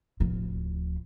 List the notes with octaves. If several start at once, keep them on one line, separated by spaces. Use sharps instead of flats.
D1 F3